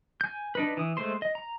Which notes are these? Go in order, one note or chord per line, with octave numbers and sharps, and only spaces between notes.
G#5 G6
D4 D#4 B4
E3 D#6
G#3 A3 C5 C6
D#5
A#5